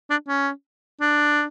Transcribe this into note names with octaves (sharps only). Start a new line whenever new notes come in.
D4
C#4
D4